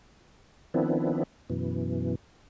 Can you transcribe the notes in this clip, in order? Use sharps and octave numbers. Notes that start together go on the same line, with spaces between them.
D#3 F3 B3 C4 D4 E4
F#2 B2 E3